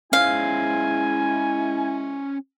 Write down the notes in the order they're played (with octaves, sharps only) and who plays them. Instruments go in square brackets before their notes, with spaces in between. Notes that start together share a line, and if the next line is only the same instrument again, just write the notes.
[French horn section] G#3 E4 [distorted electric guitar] C#4 C5 [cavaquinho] F5 [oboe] G#5